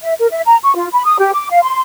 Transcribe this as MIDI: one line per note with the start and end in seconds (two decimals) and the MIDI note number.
0.02 0.13 76
0.19 0.27 70
0.31 0.41 76
0.46 0.56 82
0.63 0.75 85
0.76 0.87 65
0.93 1.02 83
1.05 1.19 87
1.19 1.33 67
1.33 1.49 86
1.50 1.60 77
1.63 1.81 84